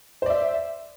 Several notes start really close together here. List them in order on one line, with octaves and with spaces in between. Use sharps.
C5 D5 E5